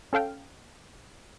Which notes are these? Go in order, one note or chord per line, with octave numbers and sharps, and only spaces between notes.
C#4 A4 F5 G5